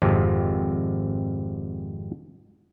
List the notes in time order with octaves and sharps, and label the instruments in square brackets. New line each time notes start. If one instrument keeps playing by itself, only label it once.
[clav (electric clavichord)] G#1 F2 C3